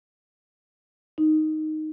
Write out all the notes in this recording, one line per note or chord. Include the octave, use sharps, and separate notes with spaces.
D#4